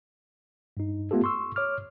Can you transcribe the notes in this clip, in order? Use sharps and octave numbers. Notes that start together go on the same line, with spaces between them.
G2 D#4
A3 B3 F4 G4 A4
C6 C#6 E6
C#5 D6 F6